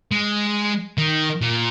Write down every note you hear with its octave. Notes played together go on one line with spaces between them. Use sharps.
G#3
D#3
A#2